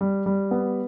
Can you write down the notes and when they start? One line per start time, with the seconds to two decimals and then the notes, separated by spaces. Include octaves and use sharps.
0.01 G3
0.26 G3
0.51 B3